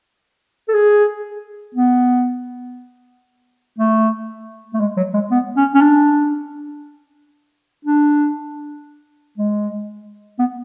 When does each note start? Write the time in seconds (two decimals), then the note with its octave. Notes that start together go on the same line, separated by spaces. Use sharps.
0.68 A4
0.74 G#4
1.75 B3
3.79 A3
4.74 A3
4.80 G#3
4.97 F#3
5.14 G#3
5.31 B3
5.57 C#4
5.75 C#4
5.82 D4
7.85 D4
9.38 G#3
10.39 B3